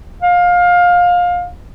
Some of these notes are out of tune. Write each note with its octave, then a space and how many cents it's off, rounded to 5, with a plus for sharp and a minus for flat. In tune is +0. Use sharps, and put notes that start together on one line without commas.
F5 +20